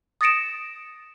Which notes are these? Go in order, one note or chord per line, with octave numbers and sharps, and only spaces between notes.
D#6 A6 A#6 C#7 D7 E7